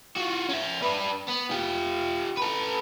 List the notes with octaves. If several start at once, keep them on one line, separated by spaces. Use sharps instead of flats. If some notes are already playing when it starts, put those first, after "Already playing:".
F4 F#4
C#4 E5
D4 B4
B3
F4 G4
A4 B4